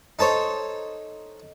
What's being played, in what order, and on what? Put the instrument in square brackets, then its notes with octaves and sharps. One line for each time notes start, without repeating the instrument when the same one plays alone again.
[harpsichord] D#4 A4 C5 C#5